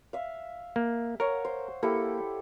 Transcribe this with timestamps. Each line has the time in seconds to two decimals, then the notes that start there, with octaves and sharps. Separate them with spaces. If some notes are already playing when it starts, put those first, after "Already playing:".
0.13 E5 F5
0.76 A#3
1.20 A#4 C#5 F#5
1.45 C5
1.83 A#3 E4 G4 A4